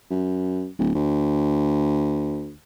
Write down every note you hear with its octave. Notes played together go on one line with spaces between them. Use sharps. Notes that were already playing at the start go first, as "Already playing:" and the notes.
F#2
D1
D2